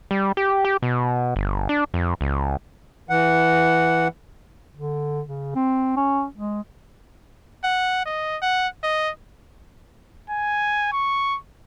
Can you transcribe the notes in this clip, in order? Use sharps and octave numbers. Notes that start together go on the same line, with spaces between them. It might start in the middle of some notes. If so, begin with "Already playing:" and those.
G3
G4
G4
B2
G1
D4
F2
C#2
E3 F#5
D3
C#3
C4
C#4
G#3
F#5
D#5
F#5
D#5
G#5
C#6